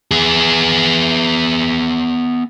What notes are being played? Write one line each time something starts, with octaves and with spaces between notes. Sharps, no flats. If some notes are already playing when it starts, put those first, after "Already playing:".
B3 G#4